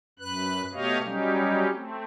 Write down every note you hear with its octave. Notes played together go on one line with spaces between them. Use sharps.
F#2 B4 F#6
B2 A3 G4 C#5 D#5 F5
F#3 G3 C#4 D#4 G4
A3 C4